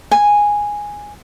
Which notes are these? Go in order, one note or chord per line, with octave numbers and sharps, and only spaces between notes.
G#5